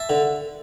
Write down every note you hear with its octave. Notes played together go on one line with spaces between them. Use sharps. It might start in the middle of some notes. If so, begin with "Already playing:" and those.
Already playing: E5 A5
D3